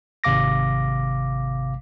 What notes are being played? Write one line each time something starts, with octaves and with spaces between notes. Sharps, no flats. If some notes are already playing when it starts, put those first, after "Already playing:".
G#1 C3 F5 D6 A#6